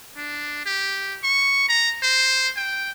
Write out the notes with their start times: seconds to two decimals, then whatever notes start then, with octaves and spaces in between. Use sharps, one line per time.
0.17 D4
0.66 G4
1.24 C#6
1.69 A#5
2.03 C5
2.56 G5